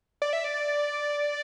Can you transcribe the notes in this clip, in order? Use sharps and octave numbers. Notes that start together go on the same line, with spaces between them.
D5
E5
D5